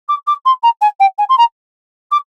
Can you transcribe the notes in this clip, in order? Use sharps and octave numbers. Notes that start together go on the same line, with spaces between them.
D6
D6
C6
A#5
G#5
G5
G#5
C6
A#5
D6